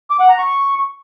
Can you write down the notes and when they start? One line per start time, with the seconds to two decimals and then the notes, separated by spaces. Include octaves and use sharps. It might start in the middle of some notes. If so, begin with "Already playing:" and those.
0.10 D6
0.20 F#5
0.29 A#5
0.39 C#6